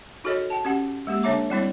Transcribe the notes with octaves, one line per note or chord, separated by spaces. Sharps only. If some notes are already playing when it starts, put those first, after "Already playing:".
D#4 F#4 G#4 A4 C#5 D#5
G5 A5
C#4 G4 F#5
G#3 A#3 G4
D3 D4 C#5 E5 A#5 D6
G3 C4 E4 C#5